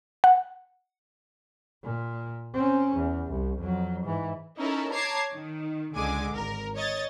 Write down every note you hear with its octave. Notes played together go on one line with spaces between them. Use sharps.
F#5
A#2
C4 C#4
E2
C2
F2 F#3
G#2 E3
C#4 D#4 E4 A4 A#4
C#5 A5 A#5 D6 G#6 C7
D#3
C#2 D3 G#3 G#5 D6
G#1 A#4
C#5 D#5 G#6 A6